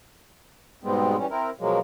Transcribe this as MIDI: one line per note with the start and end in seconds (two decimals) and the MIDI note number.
0.83 1.17 44
0.83 1.17 47
0.83 1.17 55
0.83 1.17 56
0.83 1.17 59
0.83 1.17 60
1.18 1.27 52
1.18 1.27 55
1.18 1.27 61
1.30 1.50 60
1.30 1.50 64
1.30 1.50 70
1.60 1.79 47
1.60 1.79 53
1.60 1.79 54
1.60 1.79 56
1.60 1.79 58